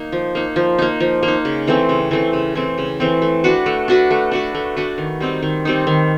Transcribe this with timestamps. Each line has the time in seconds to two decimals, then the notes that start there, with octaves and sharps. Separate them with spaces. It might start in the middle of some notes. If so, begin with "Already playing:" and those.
Already playing: A#3 D#4
0.12 F3
0.35 A#3 D#4
0.56 F3
0.78 A#3 D#4
1.00 F3
1.23 A#3
1.28 D#4
1.45 C#3
1.67 E3 A3 C4
1.89 C#3
2.11 E3 A3 C4
2.33 C#3
2.55 E3 A3 C4
2.78 C#3
3.00 E3 A3 C4
3.22 A3
3.44 D4 F#4 B4
3.66 A3
3.88 D4 F#4 B4
4.10 A3
4.31 D4 F#4 B4
4.54 A3
4.76 D4 F#4 B4
4.98 D#3
5.20 G3 C4 D#4
5.42 D#3
5.65 G3 C4 D#4
5.87 D#3